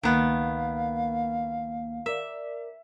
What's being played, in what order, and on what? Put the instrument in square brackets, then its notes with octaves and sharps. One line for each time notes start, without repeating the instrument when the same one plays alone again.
[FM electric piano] C#2 A#3 [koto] D#3 B3 [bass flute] F5
[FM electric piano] A#4 D5 [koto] E5